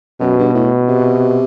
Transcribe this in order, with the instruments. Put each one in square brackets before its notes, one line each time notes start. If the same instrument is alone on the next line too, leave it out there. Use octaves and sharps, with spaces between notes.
[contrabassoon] F#2 [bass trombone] B2
[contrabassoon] G2
A2
C3